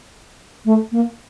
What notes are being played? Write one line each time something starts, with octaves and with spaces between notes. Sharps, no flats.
A3
A#3